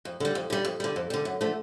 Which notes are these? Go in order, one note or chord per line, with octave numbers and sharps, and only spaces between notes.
F2
D3 G3
F2
D3 G3
F2
D3 G3
F2
D3 G3
F#2
D3 F3 A3